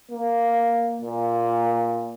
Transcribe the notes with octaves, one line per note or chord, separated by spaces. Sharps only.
A#3
A#2